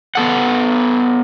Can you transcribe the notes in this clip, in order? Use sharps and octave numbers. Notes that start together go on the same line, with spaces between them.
B3 A4 F#5